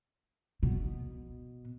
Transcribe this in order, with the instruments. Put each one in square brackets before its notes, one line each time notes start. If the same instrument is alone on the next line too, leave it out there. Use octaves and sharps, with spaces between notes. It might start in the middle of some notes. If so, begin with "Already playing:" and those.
[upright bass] B2